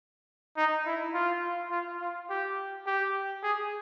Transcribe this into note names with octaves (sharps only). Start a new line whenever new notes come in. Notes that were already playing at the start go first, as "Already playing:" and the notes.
D#4
E4
F4
F4
F4
G4
G4
G#4